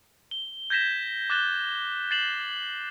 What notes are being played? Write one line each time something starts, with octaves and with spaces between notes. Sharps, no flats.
G7
G6 G#6 A#6 B6 E7
D6 F#6 A6 E7 G7
A6 C7 E7 F#7